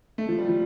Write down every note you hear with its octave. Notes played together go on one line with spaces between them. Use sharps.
A3
F3
G3
F3